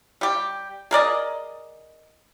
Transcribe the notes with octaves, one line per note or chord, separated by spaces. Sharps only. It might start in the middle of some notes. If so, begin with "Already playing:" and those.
G3 G4
G#4 A#4 D5 D#5